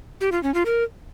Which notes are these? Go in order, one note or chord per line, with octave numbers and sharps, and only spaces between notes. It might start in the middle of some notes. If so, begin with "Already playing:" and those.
G4
F4
C#4
F4
A#4